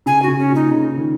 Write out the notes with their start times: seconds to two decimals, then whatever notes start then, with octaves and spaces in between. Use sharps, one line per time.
0.06 C#3 G#5
0.23 F#4
0.28 C#3
0.38 C#4
0.49 A#2
0.55 D#4
0.71 C#3
0.98 D#3